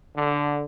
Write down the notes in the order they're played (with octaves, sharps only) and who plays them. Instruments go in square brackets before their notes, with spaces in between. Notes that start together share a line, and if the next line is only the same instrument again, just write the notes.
[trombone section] D3